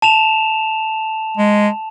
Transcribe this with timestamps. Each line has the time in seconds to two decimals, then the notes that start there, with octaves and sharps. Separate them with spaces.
0.02 A5 E7 F7
1.38 G#3